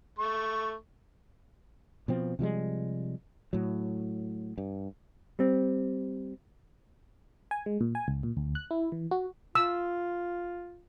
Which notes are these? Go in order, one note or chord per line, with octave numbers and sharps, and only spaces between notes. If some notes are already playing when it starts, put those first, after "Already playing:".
A3 C#6
B2 F3 C4
C3 F3 G3 G#3
A2 F#3
G2
G3 C4
G#5
G#3
A#2
G#5
C#2
A#2
D2
F#6
E4
E3
F#4
F4 E6